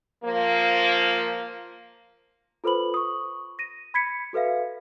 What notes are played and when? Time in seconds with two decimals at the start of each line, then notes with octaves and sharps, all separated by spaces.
0.24 F3 A#3
2.64 F4 A4 B4 C5 B5 F#7
2.94 C#6 D#6
3.59 A#6 D#7
3.94 B5 G#6 B6 C#7
4.33 F#4 A4 B4 E5 F5